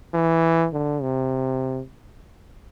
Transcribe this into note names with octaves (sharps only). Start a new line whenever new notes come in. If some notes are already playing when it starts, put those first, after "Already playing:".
E3
D3
C3